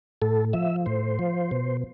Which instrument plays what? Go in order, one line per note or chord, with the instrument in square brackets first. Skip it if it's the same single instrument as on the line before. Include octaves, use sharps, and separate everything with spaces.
[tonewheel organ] A2 A4
F3 E5
A2 C5
F3
B2